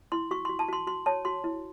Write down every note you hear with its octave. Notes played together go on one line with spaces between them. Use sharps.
E4 C6
F#4 C#6
C6
F#4
A5
F#4 C6
F#4 C6
C#5 A5
F#4 C6
E4